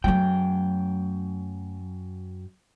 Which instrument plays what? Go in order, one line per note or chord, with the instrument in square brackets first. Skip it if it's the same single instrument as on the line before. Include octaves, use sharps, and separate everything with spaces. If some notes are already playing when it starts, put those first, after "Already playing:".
[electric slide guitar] F#2 G3 G5 [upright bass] F#3 A3